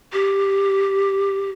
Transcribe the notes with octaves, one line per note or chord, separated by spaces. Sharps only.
G4